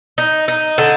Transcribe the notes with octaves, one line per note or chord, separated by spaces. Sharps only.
D#4
D#4
D3